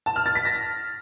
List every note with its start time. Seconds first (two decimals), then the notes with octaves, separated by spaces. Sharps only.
0.06 A5
0.16 F6
0.26 A6
0.35 B6
0.45 A#6